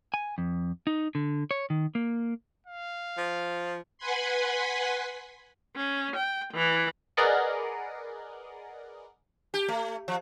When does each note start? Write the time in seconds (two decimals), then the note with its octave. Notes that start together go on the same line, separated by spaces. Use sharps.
0.14 G#5
0.38 F2
0.87 D#4
1.15 D3
1.51 C#5
1.70 D#3
1.95 A#3
2.66 F5
3.17 F3
3.98 B4 F#5 G#5 B5 C6
5.74 C#4
6.15 G5
6.52 E3
7.17 G#4 A#4 B4 D5 D#5 F#5
9.54 G4
9.68 A3
10.08 F3